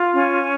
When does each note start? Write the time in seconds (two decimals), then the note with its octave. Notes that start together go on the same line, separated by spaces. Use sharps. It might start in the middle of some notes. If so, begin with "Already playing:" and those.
Already playing: F4
0.14 C#4